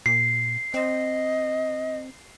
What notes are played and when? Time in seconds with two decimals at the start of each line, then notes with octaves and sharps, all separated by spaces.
0.06 A#2 C7
0.74 C4 D#5